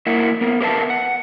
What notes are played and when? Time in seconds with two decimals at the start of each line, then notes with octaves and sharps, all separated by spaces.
0.06 A#3 E4 A#4 E5 F#5
0.41 B3 A#4
0.61 G4 A#4 B4 E5 F5 A5
0.90 F#5